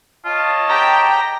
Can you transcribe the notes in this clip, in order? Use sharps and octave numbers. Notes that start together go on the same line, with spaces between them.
F4 C#5 D#5 A5
G4 G5 A#5